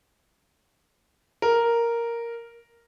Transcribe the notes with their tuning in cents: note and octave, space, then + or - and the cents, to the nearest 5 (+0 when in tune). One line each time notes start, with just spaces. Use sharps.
A#4 +0